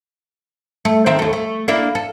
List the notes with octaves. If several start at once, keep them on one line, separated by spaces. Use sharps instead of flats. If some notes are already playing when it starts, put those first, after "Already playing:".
A3
D#3 C4 E5
D#2 A3
A3
A#3 D4 E4
A4